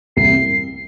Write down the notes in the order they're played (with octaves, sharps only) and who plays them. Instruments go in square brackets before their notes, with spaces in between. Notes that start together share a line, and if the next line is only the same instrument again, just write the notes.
[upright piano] C2 [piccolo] C7